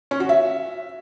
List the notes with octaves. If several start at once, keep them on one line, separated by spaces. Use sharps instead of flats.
C#4
F#4
E5